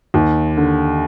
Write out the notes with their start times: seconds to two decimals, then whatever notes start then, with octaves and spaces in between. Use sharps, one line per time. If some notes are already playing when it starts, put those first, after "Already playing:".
0.14 D#2
0.57 D3